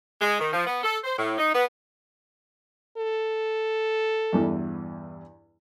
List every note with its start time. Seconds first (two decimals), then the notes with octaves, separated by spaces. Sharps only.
0.21 G#3
0.39 D#3
0.52 F3
0.66 B3
0.83 A4
1.04 C5
1.17 A2
1.38 D#4
1.54 B3
2.97 A4
4.33 E2 G2 E3